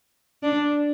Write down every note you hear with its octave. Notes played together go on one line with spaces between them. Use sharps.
D4